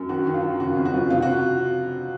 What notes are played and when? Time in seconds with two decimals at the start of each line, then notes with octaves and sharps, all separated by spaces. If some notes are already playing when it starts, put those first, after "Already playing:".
Already playing: F#2
0.09 D#3 F#4
0.27 D#3
0.34 F4
0.43 D#3
0.60 C#3 F#4
0.76 F2
0.85 F#4
0.94 F3
1.10 C3 F4
1.22 F#4